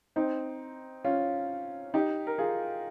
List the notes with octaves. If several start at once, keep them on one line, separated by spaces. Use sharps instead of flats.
C4 D#4
C#4 F4
D#4 G4
A#4
F4 G#4